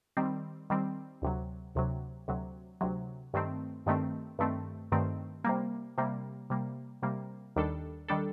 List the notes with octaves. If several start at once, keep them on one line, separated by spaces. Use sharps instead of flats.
D#3 G3 C4
D#3 G3 C4
D2 C3 F#3
D2 C3 F#3
D2 C3 F#3
D2 C3 F#3
G2 D#3 A3 C4
G2 D#3 A3 C4
G2 D#3 A3 C4
G2 D#3 A3 C4
C3 G3 A#3
C3 G3 A#3
C3 G3 A#3
C3 G3 A#3
D#2 D#3 G3 D4 A4
D#3 G3 D4 A4